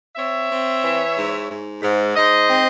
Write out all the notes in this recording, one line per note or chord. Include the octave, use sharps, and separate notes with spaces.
C4 C#5 E5
C4
E3
G#2
G#2
G#2
G#2 C5 D#5
C4